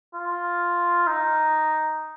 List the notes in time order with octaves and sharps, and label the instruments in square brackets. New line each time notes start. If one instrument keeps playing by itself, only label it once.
[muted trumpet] F4
D#4